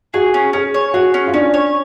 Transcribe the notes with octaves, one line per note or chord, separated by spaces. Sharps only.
F#4 G#4
C#4
C#4 G#4
C#5
F#4 G#4
C#4
F4
C#4 D4
C#5